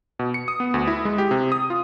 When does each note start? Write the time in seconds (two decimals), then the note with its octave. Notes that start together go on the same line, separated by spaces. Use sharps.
0.19 B2
0.34 C#7
0.48 D#6
0.60 B3
0.74 D2
0.87 E4
1.05 G#3
1.18 G4
1.31 C3
1.52 D#6
1.70 F4